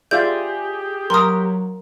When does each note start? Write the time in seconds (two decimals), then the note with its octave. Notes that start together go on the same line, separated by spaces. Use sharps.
0.11 F4 G4 G#4 D5 E5 G6
1.10 F#3 A#4 C6 D#6